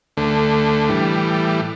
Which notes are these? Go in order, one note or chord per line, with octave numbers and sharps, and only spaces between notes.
D2 D3 A3
A2 E3 G3